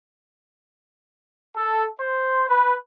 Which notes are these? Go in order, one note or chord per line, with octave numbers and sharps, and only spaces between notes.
A4
C5
B4